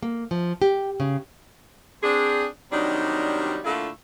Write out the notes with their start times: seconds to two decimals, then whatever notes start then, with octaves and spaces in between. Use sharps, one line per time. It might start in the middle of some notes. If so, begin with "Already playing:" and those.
0.03 A#3
0.31 F3
0.62 G4
1.00 C#3
2.03 C4 D4 G#4
2.72 C3 D#3 F#3 G3 D4 D#4
3.64 A#2 D3 A3 E4 F4 A4